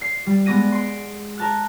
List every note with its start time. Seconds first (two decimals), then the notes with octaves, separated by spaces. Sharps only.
0.01 C7
0.27 G3
0.46 G#3 B3 D6 A#6 D#7
0.72 C6 D7
1.38 A#4 A5 F#6